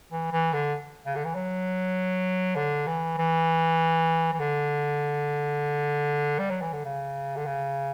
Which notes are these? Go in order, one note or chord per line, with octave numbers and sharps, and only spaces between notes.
E3
E3
D3
C#3
D3
E3
F#3
D3
E3
E3
E3
D3
G3
F#3
E3
D3
C#3
D3
C#3